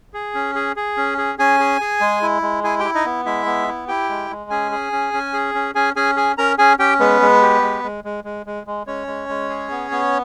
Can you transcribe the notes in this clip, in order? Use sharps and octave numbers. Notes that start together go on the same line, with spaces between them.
G#4
C#4
G#4
G#4
C#4
G#4
C#4 G#4 G#5
G#4
G#4
G#3
E4
G#3
E4 G#4 G#5
E4 G4 G5
D#4 D#5
B3
G#3 E4 E5
B3
E4
E4 G4 G5
G#3
G#3
C#4 G#4 G#5
G#4
C#4
C#4
G#4
C#4
C#4 G#4 G#5
C#4 G#4 G#5
G#4 G#5
C#4 A#4 A#5
C#4 G#4 G#5
C#4 G4 G5
G#3 B3 B4
G#3
G4
G#3
G#3
G#3
G#3
G#3
G#3
G#3 C#4 C#5
G#3
G#3
G#4
B3
B3